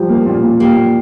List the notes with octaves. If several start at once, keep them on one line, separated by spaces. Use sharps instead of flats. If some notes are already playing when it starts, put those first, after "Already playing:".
Already playing: F3 G3
A#3
A#2
A#2
A#3 G4
A#2